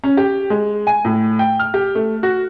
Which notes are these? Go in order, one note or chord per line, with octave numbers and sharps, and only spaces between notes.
C#4
G4
G#3
G#5
A2
G5
F6
G4
A3
F#4